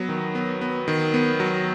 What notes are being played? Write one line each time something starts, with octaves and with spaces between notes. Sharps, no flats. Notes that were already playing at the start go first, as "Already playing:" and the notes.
Already playing: F#3 B3
D#3
B3
B3
D#3
B3
F#3